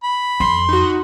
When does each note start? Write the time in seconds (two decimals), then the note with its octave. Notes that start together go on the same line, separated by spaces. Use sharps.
0.03 B5
0.40 F2 C6
0.69 D#4 F#4